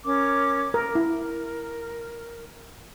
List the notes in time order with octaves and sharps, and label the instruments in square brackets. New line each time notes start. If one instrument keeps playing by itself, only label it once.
[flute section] C#4 A#4 D6
[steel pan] A#4
[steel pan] E4 [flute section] A#4